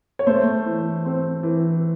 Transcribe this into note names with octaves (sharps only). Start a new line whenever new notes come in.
C#5
A3 C5
E3
C4
E3